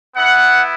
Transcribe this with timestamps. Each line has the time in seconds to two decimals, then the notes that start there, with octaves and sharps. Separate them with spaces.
0.16 B3 E4 F#5